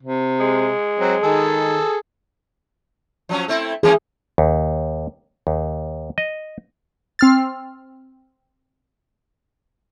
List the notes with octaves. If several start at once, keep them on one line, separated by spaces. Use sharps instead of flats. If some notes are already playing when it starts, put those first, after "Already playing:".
C3
G#3
F#3 C4
D#3 G#4 A4
F3 F#3 C#4
A3 C4 E4
E3 A#3 C#4 G#4
D#2
D#2
D#5
C4 F6 A6